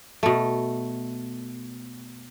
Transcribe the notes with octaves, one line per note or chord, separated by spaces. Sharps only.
B2 A3